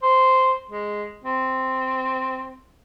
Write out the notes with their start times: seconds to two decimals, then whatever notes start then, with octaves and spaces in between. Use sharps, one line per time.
0.03 C5
0.69 G#3
1.24 C4